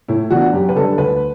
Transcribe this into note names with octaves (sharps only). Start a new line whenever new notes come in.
A2 E4
E3 B3 D4 F#4
F#2 G4
B4
D3 G3 D4 A4
D2 B4